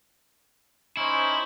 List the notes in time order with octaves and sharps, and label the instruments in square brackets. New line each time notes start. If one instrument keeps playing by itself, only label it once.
[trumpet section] C#4 D#4 C5 [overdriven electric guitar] E4